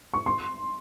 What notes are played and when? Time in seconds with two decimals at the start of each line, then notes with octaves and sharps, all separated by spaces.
0.14 C#6
0.26 C6